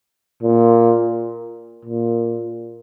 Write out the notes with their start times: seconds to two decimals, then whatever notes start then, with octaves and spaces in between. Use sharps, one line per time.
0.42 A#2
1.85 A#2